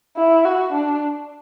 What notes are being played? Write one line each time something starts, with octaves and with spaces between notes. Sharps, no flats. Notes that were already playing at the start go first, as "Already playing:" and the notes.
E4
F#4
D4